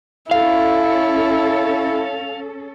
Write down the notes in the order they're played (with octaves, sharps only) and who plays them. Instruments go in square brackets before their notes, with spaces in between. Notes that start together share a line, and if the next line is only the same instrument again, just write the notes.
[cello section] C#4 A4 [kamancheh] E4 [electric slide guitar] F5